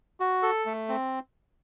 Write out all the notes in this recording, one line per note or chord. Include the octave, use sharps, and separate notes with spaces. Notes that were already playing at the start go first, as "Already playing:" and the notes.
F#4
A4
A3
C4